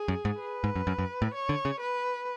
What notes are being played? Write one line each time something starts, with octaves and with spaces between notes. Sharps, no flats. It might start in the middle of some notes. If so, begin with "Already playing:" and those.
Already playing: G#4
F#2
G#2
B4
G#2
F#2
F#2
F#2
A2
C#5
D3
C#3
B4